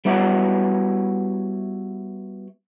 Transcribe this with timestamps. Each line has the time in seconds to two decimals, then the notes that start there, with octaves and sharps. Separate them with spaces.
0.05 G3 B3 E4 F#4 C#5